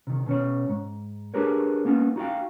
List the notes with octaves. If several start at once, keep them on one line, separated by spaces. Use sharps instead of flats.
C3 D#3
B2 C#4 C#5
G#2
D4 G4 G#4 A#4 B4 C#5
A#3 B3 C#4 D#4
D#4 F#4 G#4 F5 G5